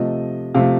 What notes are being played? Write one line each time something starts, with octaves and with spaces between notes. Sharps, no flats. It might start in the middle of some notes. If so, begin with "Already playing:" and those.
Already playing: C3 F3 A3 D#5
C3 F3 A3 F5